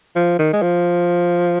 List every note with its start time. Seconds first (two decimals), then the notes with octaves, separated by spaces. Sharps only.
0.15 F3
0.39 D#3
0.53 G#3
0.62 F3